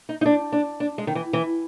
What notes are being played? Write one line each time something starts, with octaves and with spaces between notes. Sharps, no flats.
D#4
D#4
D4
D4
D4
G#3
D#3
E3
E3